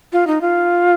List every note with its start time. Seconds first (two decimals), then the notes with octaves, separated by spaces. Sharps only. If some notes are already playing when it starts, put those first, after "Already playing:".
0.13 F4
0.27 D#4
0.41 F4